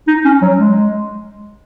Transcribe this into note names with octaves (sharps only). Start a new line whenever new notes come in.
D#4
C#4
F#3
G#3